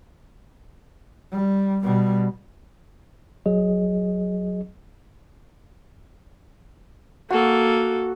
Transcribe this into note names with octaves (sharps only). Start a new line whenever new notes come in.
G3
B2 G3
A#1 F#3 G#4 D#5
A#3 F#4 A4